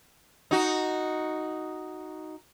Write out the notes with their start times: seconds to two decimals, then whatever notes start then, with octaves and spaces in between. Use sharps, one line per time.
0.51 D#4 F#4